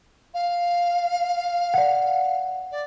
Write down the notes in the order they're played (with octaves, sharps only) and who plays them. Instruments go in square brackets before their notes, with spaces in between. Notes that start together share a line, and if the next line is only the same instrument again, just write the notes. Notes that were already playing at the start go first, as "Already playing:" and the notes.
[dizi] F5
[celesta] D5 F#5
[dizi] D5